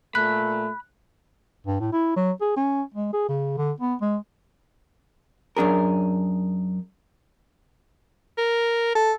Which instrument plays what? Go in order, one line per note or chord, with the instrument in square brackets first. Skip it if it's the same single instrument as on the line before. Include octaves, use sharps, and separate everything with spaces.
[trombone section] A#2 A3 [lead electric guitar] B5 [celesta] F#6
[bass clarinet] G2
A2
E4
F#3
G#4
C#4
G#3
G#4
C#3
D3
B3
G#3
[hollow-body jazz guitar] F#2 D4 G#4 A#4
[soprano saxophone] A#4
A4